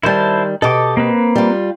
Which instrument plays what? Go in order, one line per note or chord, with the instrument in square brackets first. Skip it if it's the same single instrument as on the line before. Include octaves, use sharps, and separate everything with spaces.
[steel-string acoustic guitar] D#3 G3 [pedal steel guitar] E4 C5 A5
[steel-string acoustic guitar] B2 G4 D#5 [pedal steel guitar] A4 D6
[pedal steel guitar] A#3 C4 B4
[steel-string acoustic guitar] G3 F4